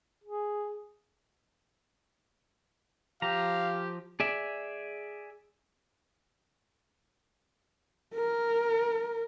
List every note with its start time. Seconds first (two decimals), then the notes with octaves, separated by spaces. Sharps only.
0.24 G#4
3.22 F3 G4 F5 A#5
4.20 G#4 D5 E5
8.15 A#4